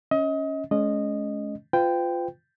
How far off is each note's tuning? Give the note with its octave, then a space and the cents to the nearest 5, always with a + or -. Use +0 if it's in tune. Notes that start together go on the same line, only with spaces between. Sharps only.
C#4 +0 D#5 +30
G#3 +35 C#4 +15 D#5 -15
F4 +0 B4 +45 G5 +0